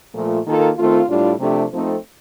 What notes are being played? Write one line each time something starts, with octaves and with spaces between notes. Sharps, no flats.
A#2 F3 A3
D#3 A#3 F4 A4
D#3 A3 C4 F4
A2 G3 D4 F4
C3 F3 A3 D4 G4
F3 A3 C4 D#4 A4